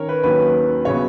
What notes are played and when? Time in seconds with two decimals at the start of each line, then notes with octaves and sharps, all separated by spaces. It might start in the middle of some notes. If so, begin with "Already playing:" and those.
Already playing: D#3 C#4 A#4 C#5
0.09 B4
0.23 D#2 D#3 F#3 C#4 B4
0.85 C#3 F#3 B3 C#5